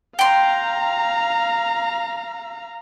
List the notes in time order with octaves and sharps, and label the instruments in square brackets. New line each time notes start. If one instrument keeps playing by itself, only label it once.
[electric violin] F5 A#5 [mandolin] G5 C6